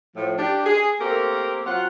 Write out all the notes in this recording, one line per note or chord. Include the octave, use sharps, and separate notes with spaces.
A2 F3
D4 G4
G#4
A3 A#3 C4 G4 A#4
F#3 C4 F4 F#5